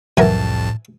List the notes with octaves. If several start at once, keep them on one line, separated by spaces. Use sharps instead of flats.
C2 F2 A2 E3 F#3 A#4 G#5 A5